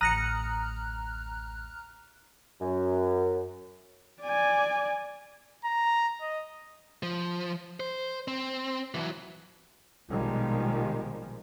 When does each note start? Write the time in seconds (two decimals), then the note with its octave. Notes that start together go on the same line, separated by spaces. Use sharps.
0.01 A1 D2 A#5 D#6 F6 F#6 A#6 C#7
2.61 F#2
4.22 D5 G#5
5.65 A#5
6.21 D#5
7.03 F3
7.80 C5
8.28 C4
8.94 E3 F#3
10.09 A#1 B2 D#3 F3 G3 G#3